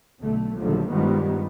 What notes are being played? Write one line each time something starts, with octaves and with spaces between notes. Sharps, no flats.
B1 D3 A3
A#1 D#2 D3 F3 F#3 A3
G2 D#3 F3 G3 G#3 B3